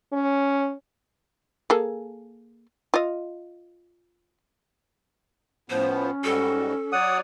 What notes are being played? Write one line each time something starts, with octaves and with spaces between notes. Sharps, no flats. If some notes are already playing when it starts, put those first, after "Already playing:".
C#4
A#3 G#4 A4
F4 D#5
A2 F3 B3 C#4 C5
G#2 G3 F#4 A4
F#3 C#5 D5 F#5 D#6